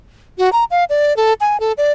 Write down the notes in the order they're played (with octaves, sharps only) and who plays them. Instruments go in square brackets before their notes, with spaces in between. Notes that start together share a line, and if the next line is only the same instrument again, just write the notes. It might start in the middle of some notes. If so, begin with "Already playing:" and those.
[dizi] F#4
A#5
F5
D5
A4
G#5
A4
D5